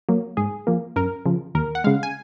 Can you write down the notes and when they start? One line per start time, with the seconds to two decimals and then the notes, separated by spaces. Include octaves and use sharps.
0.09 F#3 A#3
0.37 G#2 G#4
0.67 F3 A#3
0.96 F#2 A#4
1.26 C#3 F3
1.55 D#2 A#4
1.75 F#5
1.84 C#3 G#3 F5
2.03 G#5